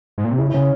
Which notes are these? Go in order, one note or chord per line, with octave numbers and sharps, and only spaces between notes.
G#2
A#2
C3
C#3 E4
E4
C#3 C#4